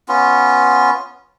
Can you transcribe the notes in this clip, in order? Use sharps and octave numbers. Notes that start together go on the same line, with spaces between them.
B3 C#4 F4